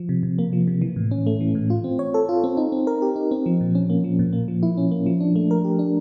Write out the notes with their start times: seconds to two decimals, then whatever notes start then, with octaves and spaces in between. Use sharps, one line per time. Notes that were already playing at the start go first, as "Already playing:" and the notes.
Already playing: F3
0.09 C3
0.23 C3
0.39 A#3
0.53 F3
0.67 C3
0.82 E3
0.96 A2
1.11 C#4
1.26 A3
1.40 E3
1.55 A2
1.70 F4
1.84 C4
1.99 C#5
2.14 A4
2.29 F4
2.44 C4
2.57 D#4
2.72 C4
2.87 A#4
3.02 G4
3.16 D#4
3.31 C4
3.46 F3
3.61 A#2
3.75 C#4
3.90 A#3
4.04 F3
4.19 A#2
4.33 A#3
4.48 F3
4.63 E4
4.77 C#4
4.91 A#3
5.06 F3
5.20 D4
5.36 A3
5.51 A#4
5.64 G4
5.79 D4